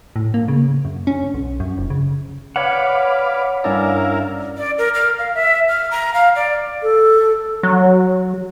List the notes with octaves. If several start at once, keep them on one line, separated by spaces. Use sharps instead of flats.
A2
A#3
C#3
F#2
C#4
B1
F#2
F1
C#3
B4 C#5 D5 F5 F#5
G2 C#4 E4 A#4 D5 F5
D5
A#4
F6
F5
E5
F6
A#5
F5
D5
A4
F#3